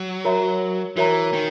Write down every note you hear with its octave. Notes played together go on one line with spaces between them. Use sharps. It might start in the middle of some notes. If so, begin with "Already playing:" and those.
Already playing: F#3
F#4 A#4 C#5 E5 A#5
E3 F#4 A#4 C#5 E5 A#5
D#3